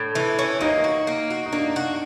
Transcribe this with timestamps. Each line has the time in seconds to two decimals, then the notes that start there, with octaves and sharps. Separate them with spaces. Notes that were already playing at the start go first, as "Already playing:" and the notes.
Already playing: A2 D4
0.15 E3
0.39 C#4
0.61 A#3 D#4
0.84 F#4
1.07 A#3
1.30 F#4
1.46 D#4
1.53 A#3 D4
1.76 F#4